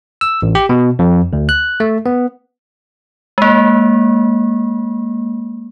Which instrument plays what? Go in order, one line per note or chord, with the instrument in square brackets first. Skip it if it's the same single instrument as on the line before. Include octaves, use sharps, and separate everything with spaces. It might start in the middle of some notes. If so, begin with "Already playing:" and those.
[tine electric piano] E6
A1
G4
B2
F2
D2
F#6
A3
B3
[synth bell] G#3 A#3